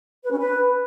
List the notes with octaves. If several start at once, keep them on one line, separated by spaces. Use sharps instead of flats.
B4
C#4
B4